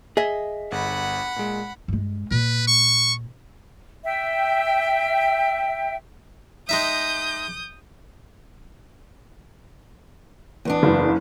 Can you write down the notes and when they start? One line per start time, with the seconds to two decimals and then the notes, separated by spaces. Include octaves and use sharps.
0.17 G#4 D#5 E5 B6
0.72 G1 F#5 B5
1.36 A#2 G#3
1.88 G2 G#3
2.31 A#2 B4
2.68 C#6
4.04 E5 G5
6.69 G#3 D#4 E5 D#6 G6
10.65 E2 B3 D4
10.83 F#1